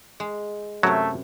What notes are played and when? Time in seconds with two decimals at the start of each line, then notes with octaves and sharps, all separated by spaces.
0.20 G#3
0.83 F#2 C3 F#3 A3